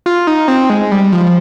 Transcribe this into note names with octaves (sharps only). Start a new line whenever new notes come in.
F4
D#4
C4
G#3
G3
F3